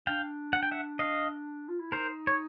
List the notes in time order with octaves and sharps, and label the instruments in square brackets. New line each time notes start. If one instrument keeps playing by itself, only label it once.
[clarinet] D4 [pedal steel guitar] F5 G5
[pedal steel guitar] F#5
G5
E5 F#5
D#5 F5
[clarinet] F4
E4
[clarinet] D#4 [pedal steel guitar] A#4 C5
[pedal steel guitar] C#5